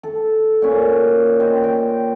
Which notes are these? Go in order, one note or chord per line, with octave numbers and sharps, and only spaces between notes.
A4
A#2 C#4 B5
G4 C5 D#5
G5